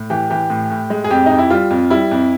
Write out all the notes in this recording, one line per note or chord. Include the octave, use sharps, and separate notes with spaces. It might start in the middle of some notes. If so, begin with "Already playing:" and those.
Already playing: A2
E3 G4
E3 G4
A2
A2
G#3
G#4
F2 G4
F2 D#4
E4
G3 F4
F2
G3 E4
F2